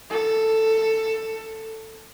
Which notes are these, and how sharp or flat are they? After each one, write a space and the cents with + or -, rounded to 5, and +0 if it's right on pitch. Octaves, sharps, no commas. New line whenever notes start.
A4 +10